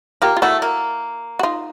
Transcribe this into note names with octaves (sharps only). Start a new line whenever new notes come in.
A#3 F4 G4
F4
A3 E4 F#4
A#3
F#4
D#4 F4